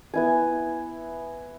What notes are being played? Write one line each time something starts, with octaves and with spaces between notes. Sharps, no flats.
B3 E4 G#5